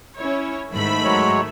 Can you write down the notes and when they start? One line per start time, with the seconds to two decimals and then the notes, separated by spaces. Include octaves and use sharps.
0.18 C#4 E4 C#5
0.72 G#2 D#3 A3 E5 B5
1.05 F#3 G#3 C#5